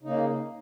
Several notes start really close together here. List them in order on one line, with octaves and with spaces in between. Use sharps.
C#3 D#4 A#3